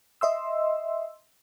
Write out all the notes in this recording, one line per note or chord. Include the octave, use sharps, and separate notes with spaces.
D#5 E5 C6 E6